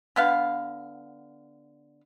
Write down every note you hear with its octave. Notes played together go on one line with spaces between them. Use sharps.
D3 B3 F5